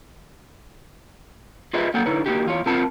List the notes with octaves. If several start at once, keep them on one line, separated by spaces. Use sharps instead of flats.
F4 G#4 B4 C5 D#5 E5
F#3 A#3 A4 F#5 G5
D3 D#4 E4 B4 C#5
A#3 D#4 F#4 G4
E2 F4 C#5
C4 F4 A#4 C5 F#5 A5